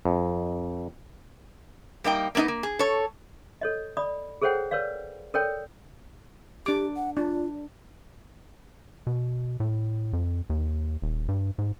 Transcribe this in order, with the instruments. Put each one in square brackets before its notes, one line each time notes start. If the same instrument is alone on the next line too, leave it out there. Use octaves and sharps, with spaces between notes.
[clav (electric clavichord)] F2
[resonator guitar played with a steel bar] G3 A#3 D#4 G5
A#3 B3 C#4 D#4 D#5
A#3
G#4
A4 C#5
[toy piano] A4 C#5 D#5
D5 B5 D#6
G#4 A4 C5 C#5 F#5 G5
A#4 B4 C#5 D5 F5
A4 A#4 C#5 D5 G5
[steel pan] D4 D6 [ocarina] G4
[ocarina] F#5
[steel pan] D4 [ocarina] F4
[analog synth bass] B2
A2
F2
D#2
D#1
G2
G#2